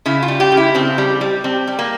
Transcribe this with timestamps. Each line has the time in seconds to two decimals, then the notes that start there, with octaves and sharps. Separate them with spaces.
0.06 C#3 E4
0.22 F4
0.28 G3
0.40 G4
0.52 C#3
0.57 E4
0.75 C#3 C4
0.98 G3
1.21 G3
1.44 G3 C4
1.67 G3
1.79 A#3